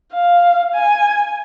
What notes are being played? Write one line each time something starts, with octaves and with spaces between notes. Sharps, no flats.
F5
G#5